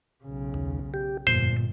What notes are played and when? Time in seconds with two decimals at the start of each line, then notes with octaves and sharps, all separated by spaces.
0.23 B1 C#3
0.54 D#2
0.94 G4
1.27 G1 F2 A#2 C5